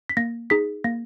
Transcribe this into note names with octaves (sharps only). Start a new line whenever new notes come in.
B6
A#3 A#6
D#4 G#4 B6
A#3 A#6